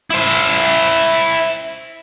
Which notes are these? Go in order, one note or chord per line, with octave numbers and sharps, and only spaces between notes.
E4 C5